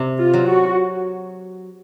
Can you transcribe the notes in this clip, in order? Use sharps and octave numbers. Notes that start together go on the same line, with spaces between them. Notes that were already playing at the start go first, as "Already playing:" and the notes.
Already playing: C3
F4
F#3
F#4